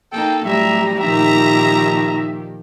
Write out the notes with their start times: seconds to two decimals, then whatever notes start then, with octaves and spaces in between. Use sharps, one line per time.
0.13 A#3 D#4 A4 G5
0.45 A2 F#3 G3 G4 E5 A#5
1.02 A#2 D#3 F3 D#4 E5 A#5